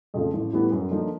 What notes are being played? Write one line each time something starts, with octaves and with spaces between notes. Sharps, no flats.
F2 C#3 F3 A3
A1
A2 E3 G3 B3
F#2
D3 F3 A#3 D#4